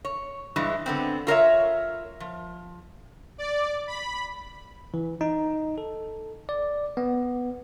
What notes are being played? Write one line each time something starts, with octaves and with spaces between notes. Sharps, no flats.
C#5
G2 E3 G#3
D3 B3 C4
F4 A#4 C#5 E5
F3
D5
B5
E3
D#4
A4
D5
B3